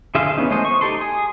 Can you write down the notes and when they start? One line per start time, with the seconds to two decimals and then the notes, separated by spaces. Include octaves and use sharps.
0.15 D3 G#4 E5 F5 C6
0.37 E3 B3 C#4 D#4
0.50 G#3 A3 C5 D#5
0.65 C#6
0.81 D#4 G4 A4 C6
1.01 G#4